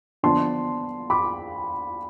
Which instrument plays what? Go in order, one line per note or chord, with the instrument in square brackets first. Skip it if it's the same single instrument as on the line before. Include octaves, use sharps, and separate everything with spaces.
[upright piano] D3 F3 B3 D4 A5 C6
B5 D6